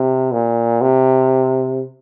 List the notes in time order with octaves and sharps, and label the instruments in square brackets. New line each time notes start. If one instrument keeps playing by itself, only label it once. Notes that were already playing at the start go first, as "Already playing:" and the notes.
Already playing: [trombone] C3
A#2
C3